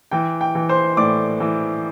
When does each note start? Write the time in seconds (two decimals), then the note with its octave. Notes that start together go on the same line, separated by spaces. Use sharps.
0.11 E3 G5
0.41 G5
0.55 E3
0.69 C5 C6
0.97 A2 D5 D6
1.40 E3